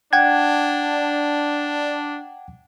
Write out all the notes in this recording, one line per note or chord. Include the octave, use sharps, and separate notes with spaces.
D4 F#5 G5 G#6